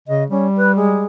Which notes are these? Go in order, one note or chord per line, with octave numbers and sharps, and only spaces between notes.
C#3 D#5
G3 C#4
B4
G#3